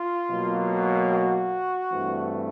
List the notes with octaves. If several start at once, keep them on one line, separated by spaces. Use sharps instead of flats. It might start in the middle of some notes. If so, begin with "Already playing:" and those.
Already playing: F4
B2 F#3 A#3
F#4
G2 E3 A3 C4